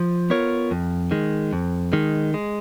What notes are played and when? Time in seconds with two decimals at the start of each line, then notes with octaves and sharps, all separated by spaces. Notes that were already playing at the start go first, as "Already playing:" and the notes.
Already playing: F3
0.30 B3 F4 A#4 C#5
0.71 F2
1.11 D#3 G#3
1.53 F2
1.93 D#3 G#3
2.34 G#3